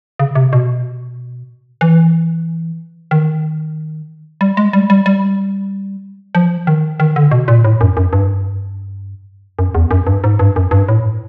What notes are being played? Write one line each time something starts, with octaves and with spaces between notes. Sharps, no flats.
C#3
C3
B2
E3
D#3
G3
G#3
G3
G3
G3
F3
D#3
D#3
D3
B2
A#2
A2
F#2
F#2
G2
F#2
E2
F#2
G2
G#2
G2
F#2
G2
A2